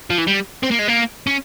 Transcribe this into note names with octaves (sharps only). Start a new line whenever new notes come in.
F3
E3
G3
C4
A#3
G#3
A#3
C#4